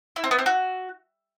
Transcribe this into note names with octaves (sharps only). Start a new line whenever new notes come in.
E4
C4
B3
C4
F#4